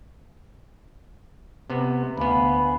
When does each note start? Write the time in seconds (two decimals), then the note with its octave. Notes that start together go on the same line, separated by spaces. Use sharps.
1.70 C3 B3
2.18 D2 B3 F5 G#5 B5